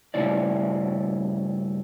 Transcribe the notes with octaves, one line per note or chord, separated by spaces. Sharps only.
G2 C#3 A3 E4 D5